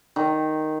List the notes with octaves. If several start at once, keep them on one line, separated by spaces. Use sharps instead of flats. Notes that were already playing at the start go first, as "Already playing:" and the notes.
D#3